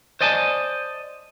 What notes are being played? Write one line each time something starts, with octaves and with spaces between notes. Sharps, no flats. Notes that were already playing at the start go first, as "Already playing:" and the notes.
C5 D5 D#5 G#5 A5